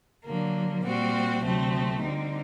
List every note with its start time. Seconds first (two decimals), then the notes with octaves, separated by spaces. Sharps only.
0.24 D3 F#3 A#3
0.83 A#2 G3 C4 F#4
1.42 D2 C3 F#3 A3 C4
2.00 D3 G3 C4 D#4